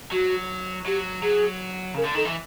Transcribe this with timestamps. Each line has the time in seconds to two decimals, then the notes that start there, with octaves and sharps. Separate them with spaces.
0.11 F#3 F#4
0.86 F#3 G4
1.23 F#3 G#4
1.94 C#3 A#4
2.05 D3
2.14 D#3 A4
2.25 E3